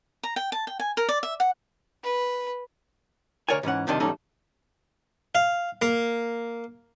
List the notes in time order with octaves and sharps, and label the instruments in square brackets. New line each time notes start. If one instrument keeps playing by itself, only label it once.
[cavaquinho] A#5
G5
A5
G5
G#5
A#4
D5
E5
F#5
[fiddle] B4
[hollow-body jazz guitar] D2 A#4 C#5 D5 G#5
G#2 E3 C#4 F#5
C2 F2 C3 D#3 D4 D#5
E2 G#2 G3 C#4 D#4 A4
[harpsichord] F5
A#3